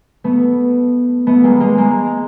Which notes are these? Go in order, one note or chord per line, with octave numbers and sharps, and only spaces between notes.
A3 B3
A3 B3
G#3 A#3
G#3 A#3
G#3 A#3